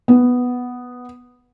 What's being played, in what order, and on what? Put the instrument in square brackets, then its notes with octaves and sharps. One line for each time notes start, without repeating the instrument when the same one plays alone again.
[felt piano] B3